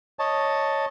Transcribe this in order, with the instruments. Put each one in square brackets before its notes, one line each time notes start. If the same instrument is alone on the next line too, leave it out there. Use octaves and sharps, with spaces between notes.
[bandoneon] C#5 D#5 A5